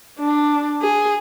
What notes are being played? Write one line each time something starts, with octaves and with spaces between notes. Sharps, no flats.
D4
G#4